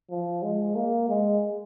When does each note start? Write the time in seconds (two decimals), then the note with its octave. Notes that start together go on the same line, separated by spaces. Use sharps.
0.10 F3
0.42 G#3
0.75 A#3
1.08 G#3